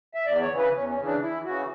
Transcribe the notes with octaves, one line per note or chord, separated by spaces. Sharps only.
E5
E2 D5
C#5
C#3 E3
B4
E2 C#4
C#4
C#3 E3
D4
E2 E4
C#3 E3 F#4